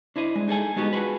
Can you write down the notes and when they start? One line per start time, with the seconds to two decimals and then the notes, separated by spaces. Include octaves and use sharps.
0.16 D4 E4 C5 D#5
0.35 G#3
0.48 D#4 G#4 A4 G#5
0.76 G#3 B3 D#4 F#4 G4
0.93 D4 F4 F#4 G#4 B4